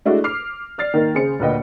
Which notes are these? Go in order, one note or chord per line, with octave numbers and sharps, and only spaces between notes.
G#3 A3 D4 E4 F#4
D6 F6 C7
D5 F6 A6 C7
D#3 A#3 A#4
C#3 G#4 C5 C#7
D2 A#2 B4 D#5 G5